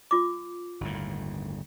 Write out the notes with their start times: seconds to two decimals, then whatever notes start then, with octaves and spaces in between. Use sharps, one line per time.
0.11 F4 D6
0.81 G1 D#2 A2